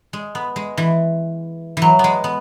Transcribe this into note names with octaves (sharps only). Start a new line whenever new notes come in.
G#3
B3
G#3
E3
E3 F#3
G#3 B3
B3